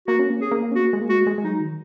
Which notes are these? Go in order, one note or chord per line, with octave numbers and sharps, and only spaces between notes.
A#3 F#4
C#4
A#3
C#4 G#4
A#3
C#4
A#3 F#4
G#3
A#3
G#3 F#4
G#3
G#3
F#3 D#4
D#3